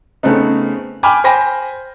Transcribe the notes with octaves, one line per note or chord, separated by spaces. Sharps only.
C#3 A3 B3 C4 D#4
G5 G#5 B5 D6 F6
C5 G5 G#5 B5 A#6